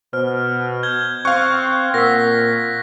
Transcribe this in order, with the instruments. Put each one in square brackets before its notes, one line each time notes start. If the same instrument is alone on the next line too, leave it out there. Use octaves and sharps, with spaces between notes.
[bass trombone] B2 [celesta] C5 [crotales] F6
[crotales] G6 G#6 G7
[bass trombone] C4 [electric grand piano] F5 C#6 [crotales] F#6
[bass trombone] A#2 [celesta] A#4 F#5 E6 [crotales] A#6 B6